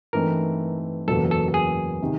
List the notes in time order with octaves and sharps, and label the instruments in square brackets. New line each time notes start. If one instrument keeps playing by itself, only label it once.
[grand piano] G2 E3 A3 C4 D#4 [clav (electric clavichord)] A#4
[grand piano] F#1 E2 B2 F#3 A#3 [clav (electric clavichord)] A4
[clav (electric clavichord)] A4
G#4
[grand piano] C3 D#3